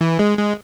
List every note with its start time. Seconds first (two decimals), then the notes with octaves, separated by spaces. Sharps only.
0.01 E3
0.19 G#3
0.38 G#3